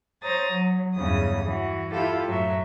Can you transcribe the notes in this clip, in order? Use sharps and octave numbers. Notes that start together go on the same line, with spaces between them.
C5 C#5 A#5 D#6 A6
F#3
E2 G2 C#3 C#4 D#6
E3 F#4
E4 F4 G4 A4
F#2 A2 F#3 E5